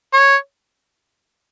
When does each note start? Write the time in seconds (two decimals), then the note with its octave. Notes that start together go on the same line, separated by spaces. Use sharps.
0.13 C#5